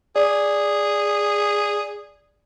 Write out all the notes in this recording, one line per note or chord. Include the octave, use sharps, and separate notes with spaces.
G#4 D5